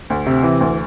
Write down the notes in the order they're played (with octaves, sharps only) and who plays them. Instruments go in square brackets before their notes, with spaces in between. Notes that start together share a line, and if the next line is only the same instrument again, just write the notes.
[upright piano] D2
C3
E3
D2